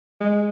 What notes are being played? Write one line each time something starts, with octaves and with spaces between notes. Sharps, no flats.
G#3